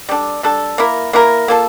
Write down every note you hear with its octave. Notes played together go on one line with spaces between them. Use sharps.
G3 D4 A4
G3 D4 A4
A#3 E4 A#4
A#3 E4 A#4
A#3 F4 A4